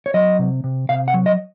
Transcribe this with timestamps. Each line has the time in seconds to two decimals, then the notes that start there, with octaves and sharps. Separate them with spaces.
0.06 C#5
0.14 F#3 D#5
0.39 C3
0.64 C3
0.89 C3 F5
1.08 F#5
1.14 F#3
1.26 D#5